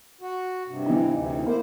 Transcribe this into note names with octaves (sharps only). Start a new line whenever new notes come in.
F#4
G2 C3
E3 D#4
D2 C3
A#3 E4 C5